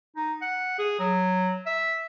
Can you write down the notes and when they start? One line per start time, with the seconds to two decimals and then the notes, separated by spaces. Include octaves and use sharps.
0.16 D#4
0.42 F#5
0.79 G#4
0.99 F#3
1.66 E5